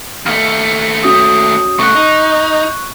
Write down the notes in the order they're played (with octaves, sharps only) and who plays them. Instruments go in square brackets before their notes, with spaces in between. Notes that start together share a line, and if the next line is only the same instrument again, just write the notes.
[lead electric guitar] D#2 A3 [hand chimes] F6
[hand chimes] C#4 F#4 D#6
[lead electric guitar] C2 A3 [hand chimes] C#6 F#6
[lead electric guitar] D#4